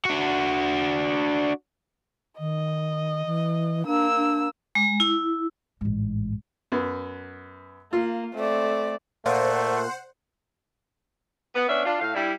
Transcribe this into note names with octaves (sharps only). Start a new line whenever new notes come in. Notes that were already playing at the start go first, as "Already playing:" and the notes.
D4 F#4
D#3 D#5
E3
A#3 D4 E6
D4
G#3
E4
A1 G#2
F#2 B3
A#3 F4
A3 C4 D5
A#2 A3 C5 F#5
B3
B3 C#4 D4 D5 E5
D4 F4
A2 F5
G3 D4 E4